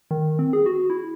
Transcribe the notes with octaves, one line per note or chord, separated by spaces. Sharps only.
D#3
C4
G#4
F#4
E4